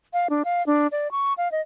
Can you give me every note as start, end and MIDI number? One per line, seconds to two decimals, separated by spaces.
0.13 0.28 77
0.30 0.43 62
0.45 0.65 77
0.67 0.87 62
0.92 1.11 74
1.11 1.33 85
1.37 1.51 77
1.52 1.61 75